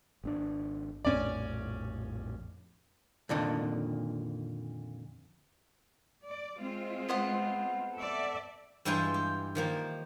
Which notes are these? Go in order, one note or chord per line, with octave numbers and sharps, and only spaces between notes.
G#1 C4 D4
A#1 F2 A2 C#4 D5
F2 A#2 D3 D#3
D5
G#3 C4 F4
B3 C5 F#5
A4 D5 E5
G2 E3 G#3 F4 G5 G#5
G4
D#3 F3 A#3